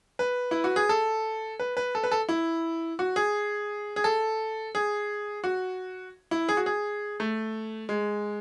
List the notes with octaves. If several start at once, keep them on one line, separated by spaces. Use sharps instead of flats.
B4
E4
F#4
G#4
A4
B4
B4
A4
B4
A4
E4
F#4
G#4
G#4
A4
G#4
F#4
E4
G#4
F#4
G#4
A3
G#3